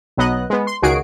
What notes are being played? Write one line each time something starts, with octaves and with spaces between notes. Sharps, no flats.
B1 F#3 B3 D#5 F#6
G#3 B3
C6
C#2 D#3 F#4 G#4 C7 D7